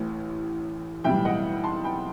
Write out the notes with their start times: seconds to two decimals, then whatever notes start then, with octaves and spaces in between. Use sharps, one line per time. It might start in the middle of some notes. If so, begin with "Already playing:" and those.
Already playing: A1 A2 E3
1.04 B1 A2 E3 G3 E5 G5
1.25 D#5 F#5
1.63 A5 C6
1.84 G5 B5